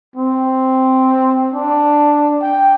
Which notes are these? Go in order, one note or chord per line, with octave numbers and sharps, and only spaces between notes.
C4
D4
G5